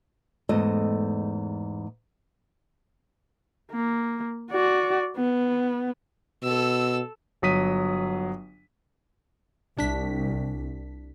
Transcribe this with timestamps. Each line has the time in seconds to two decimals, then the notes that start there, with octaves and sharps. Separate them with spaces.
0.49 E2 G#2 A3 D#5
3.72 A#3
4.51 F#4 D5
5.17 B3
6.43 B2 A4 E6
7.42 G1 F#3 D#6 B6 D#7
9.77 C2 C3 D4 B6